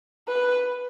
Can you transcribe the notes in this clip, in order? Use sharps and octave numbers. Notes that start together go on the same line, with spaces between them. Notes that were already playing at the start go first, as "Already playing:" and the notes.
B4